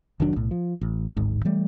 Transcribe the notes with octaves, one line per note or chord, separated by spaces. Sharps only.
F1 D#3 F#3 D4
B1 A2
F3
A1
D1 G#1 G#2
E3 G3 A3